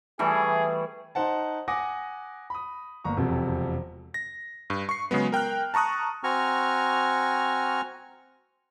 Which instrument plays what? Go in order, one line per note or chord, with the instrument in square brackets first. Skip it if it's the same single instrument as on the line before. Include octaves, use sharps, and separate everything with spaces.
[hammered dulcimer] E3 G3 A3 [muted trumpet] G#4
[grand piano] D#4 C5 F#5 A5
F#5 G#5 D6 D#6 A#6
B5 D#6
G1 A#3 A#5 C#6
E1 F2 C3 C4
[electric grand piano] A#6
G2
C#6 C7
C#3 F#3 G#3 B3
A#4 G5 F6 F#6
A5 A#5 C#6 D#6 F#6
[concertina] C4 F#4 G#5 A#5 C#6 F6